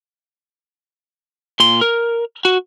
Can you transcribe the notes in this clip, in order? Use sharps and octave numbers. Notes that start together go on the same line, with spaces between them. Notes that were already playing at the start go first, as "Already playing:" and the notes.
A#2 C6
A#4
F#4